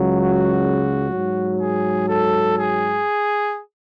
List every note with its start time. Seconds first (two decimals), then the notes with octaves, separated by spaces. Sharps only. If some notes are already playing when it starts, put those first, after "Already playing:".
Already playing: C#2 C#3 F#3
0.13 F#4
1.10 G#2 F#3
1.59 G#4
2.08 A4
2.57 G#4